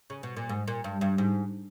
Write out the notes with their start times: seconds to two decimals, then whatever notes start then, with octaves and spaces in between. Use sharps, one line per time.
0.10 C#3
0.23 B2
0.36 A#2
0.49 G#2
0.68 A#2
0.84 G2
1.01 G2
1.18 G#2